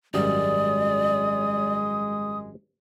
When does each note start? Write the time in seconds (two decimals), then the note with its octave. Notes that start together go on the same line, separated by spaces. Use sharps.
0.14 G#1 F#2 G3 G#3 D5 D#6